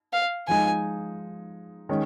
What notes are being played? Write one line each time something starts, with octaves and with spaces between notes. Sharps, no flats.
F5
F3 G#3 D#4 G#5
D#3 G#3 C#4